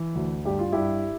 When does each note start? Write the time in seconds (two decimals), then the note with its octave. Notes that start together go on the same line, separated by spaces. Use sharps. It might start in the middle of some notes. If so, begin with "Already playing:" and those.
Already playing: E3
0.15 D2
0.45 G2 G4
0.59 F4
0.72 G2 E4 G4